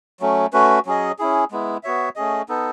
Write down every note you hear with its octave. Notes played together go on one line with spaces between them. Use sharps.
F#3 A3 C#4
A3 C#4 F#4 B4
F#3 C#4 G#4 D#5
C#4 E4 G#4
G#3 B3 E4
B3 F#4 C#5 E5
A3 C#4 G#4 D#5
B3 D#4 A4